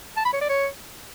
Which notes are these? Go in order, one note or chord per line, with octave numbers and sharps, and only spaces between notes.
A5
B5
C#5
D5
C#5